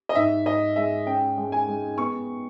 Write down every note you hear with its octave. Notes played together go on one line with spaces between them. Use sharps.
D#5
G#2 E5
G#2 D#5
G#3 E5
C#4 G5
G#3
G#5
G#3
B3 C#6